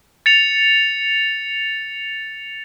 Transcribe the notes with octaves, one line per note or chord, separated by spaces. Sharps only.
A6 C#7 F7